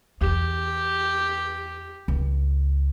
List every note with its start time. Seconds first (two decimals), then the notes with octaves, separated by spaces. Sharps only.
0.21 E2 G4
2.08 C#2